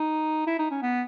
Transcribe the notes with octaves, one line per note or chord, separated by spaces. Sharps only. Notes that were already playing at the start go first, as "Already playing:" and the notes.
Already playing: D#4
E4
D#4
C#4
B3